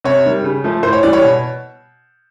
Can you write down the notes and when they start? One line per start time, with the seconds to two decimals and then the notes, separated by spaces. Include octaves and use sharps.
0.04 C3 C#5
0.25 D#3 G3
0.44 C#3
0.64 F3 A3
0.83 A2 C5
0.93 C#5
1.03 E3 G3 D5
1.13 C#5
1.22 B2